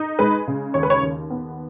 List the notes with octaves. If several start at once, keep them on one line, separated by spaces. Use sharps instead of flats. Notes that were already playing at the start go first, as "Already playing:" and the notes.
Already playing: D#4
G#3 B4
C#3
D#2 C#5
B4
C#5
D#2
B3